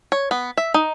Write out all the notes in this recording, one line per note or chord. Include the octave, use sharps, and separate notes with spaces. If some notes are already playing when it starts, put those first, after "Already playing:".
C#5
B3
E5
D#4